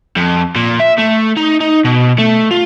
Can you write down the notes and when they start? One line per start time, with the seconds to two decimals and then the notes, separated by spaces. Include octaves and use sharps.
0.16 F2
0.55 A#2
0.80 E5
0.99 A3
1.37 D#4
1.61 D#4
1.85 B2
2.18 A3
2.51 F4